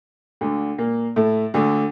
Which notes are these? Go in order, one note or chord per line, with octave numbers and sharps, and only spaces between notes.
D2 D3
A#2 A#3
A2 A3
D2 D3